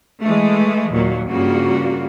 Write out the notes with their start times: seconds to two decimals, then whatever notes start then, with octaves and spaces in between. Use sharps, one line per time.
0.22 E3 G#3 A3
0.91 D#2 A#2 F#3
1.30 G2 C#3 G3 A#3 F4 F#4